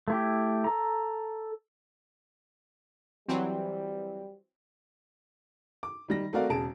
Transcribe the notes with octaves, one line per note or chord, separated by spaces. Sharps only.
A3 E4 G4
A4 A#5
E3 F#3 G3 C4
D6
D#3 G3 A#6
A3 C4 F#4 A#4 D5 F5
E1 C#3 G#4 A5 D7